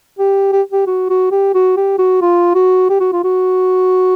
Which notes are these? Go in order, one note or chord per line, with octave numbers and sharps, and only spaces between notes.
G4
G4
G4
F#4
F#4
G4
F#4
G4
F#4
F4
F#4
G4
F#4
F4
F#4